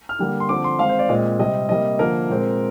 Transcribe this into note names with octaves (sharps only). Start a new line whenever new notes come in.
F6
D3 G3 A#3
C6
D3 F3 C4 D6
C6
D#3 G#3 C4 F5
C5
D5
A#2 G#3 C4 D#5
C3 G3 C4 D#5
C3 G3 A#3 D#5
D3 F3 A#3 A#4
A#2 G#3 C4